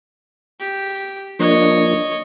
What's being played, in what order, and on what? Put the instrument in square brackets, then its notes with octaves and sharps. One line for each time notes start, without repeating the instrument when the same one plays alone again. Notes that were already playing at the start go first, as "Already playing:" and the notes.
[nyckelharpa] G4
[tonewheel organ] F3 A#3 D4 [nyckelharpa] C#5 D#5